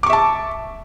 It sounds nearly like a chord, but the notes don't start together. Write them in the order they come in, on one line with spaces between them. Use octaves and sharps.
D6 C#6 E5 A5